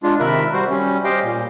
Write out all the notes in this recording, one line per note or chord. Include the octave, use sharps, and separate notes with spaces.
G#3 D4 F4
C3 D#3 A#4 E5 B5 F#6
G3 F#4 C5
G3 C#4
G4 C5 D#5 F5 G5
A#2